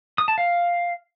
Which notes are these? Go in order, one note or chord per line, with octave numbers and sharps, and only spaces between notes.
D#6
A5
F5